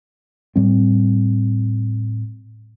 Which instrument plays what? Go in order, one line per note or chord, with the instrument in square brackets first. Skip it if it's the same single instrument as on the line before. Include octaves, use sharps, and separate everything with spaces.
[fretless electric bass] A2 G3 C4